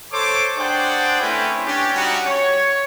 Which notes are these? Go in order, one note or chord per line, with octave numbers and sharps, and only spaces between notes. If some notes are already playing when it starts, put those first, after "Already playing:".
A4 C5 C#5 C6 D6
D4 G#4 C5 D5 F#5 G5
A3 C4 C#4 E4 B4 G5
C#4 D4 G4
G3 C#4 D#4 F#4 G4 F#5
C#5